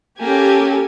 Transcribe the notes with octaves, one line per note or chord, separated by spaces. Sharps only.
A#3 C#4 G4 A4 G#5